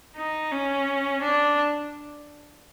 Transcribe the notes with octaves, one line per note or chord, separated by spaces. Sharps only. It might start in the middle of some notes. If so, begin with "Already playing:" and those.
D#4
C#4
D4